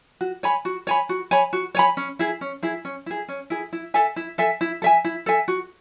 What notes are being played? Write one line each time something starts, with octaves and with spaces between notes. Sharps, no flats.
F#4
C#5 G#5 B5
F#4
C#5 G#5 B5
F#4
C#5 G#5 B5
F#4
C#5 G#5 B5
C#4
E4 G#4
C#4
E4 G#4
C#4
E4 G#4
C#4
E4 G#4
E4
A4 E5 G#5
E4
A4 E5 G#5
E4
A4 E5 G#5
E4
A4 E5 G#5
F#4